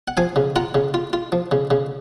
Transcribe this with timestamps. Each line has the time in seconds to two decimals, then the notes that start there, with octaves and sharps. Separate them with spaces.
0.08 F#5
0.17 F3 F5 G#5
0.36 C#3
0.56 F4 F#5 A#5
0.75 C#3
0.94 F4
1.13 F4
1.32 F3
1.52 C#3
1.71 C#3